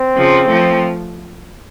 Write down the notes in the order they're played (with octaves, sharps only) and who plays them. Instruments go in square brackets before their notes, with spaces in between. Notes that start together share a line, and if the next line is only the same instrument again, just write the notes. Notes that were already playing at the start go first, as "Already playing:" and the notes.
Already playing: [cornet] C4
[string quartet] C#3 F3
F3 A3